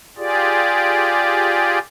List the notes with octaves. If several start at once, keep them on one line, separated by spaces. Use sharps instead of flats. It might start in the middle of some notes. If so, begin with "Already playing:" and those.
F4 G4 G#4 D5